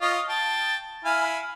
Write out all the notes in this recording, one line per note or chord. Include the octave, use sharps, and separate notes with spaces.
F4 C#5 D#5
G5 A5
E4 F5 G#5